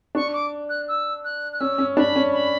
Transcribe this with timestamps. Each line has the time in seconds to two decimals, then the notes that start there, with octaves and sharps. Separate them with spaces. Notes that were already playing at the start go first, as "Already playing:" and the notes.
0.15 D4 C#6
0.34 D6
0.69 F#6
0.88 E6
1.25 F#6
1.53 F#6
1.61 C#4 E6
1.78 C#4
1.97 D4 B5
2.16 C#4
2.33 B5